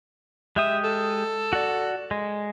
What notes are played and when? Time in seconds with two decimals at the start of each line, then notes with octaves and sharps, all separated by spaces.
0.56 G#3 G4 E5 D#6
0.84 A4
1.53 F#4 D5
2.11 G#3